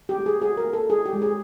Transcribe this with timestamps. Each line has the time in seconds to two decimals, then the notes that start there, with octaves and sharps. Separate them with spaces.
0.09 G4
0.18 A3
0.26 G#4
0.42 F#4 G#4
0.57 A#4
0.66 A#3
0.73 A4
0.89 E4 G#4
1.06 G4
1.13 G#3
1.22 G#4